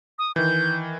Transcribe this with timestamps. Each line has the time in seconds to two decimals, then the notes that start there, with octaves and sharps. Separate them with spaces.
0.19 D#6
0.36 D#3 E3 G6